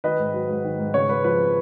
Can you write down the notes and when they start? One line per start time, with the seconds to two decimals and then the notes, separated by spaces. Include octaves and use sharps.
0.04 D#3 B4 D#5
0.19 G#2
0.34 F#3
0.48 G#2
0.64 D#3
0.79 G#2
0.94 C#3 C#5
1.09 G#3 B4
1.24 F3 B4